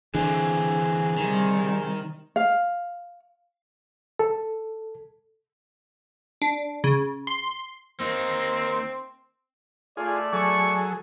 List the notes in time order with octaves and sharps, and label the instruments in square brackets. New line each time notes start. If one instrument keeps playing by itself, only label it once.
[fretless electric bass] D3 [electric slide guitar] E3 C4 [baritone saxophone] G#4
[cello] C3 G3 [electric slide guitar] D#3
[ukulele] F5
[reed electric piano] A4
[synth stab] D4
C#3
C6
[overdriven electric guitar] A#3 D#4 [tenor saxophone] C4
[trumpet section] A3 D5 [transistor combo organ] F4 G#4
[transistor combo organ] F#3 G#4 A4 [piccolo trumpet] C#6